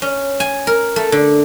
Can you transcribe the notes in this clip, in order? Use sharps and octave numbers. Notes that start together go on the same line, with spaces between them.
C#4
G#5
A#4
A3
D3